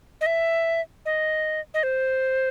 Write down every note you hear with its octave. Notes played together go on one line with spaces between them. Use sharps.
D#5
E5
D#5
D#5
C5